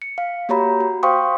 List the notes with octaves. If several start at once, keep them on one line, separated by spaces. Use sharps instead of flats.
C#7
F5
A#3 F#4 G4 C#5 A#5 B5
F#4
C5 F5 G5 C6 C#6 D#6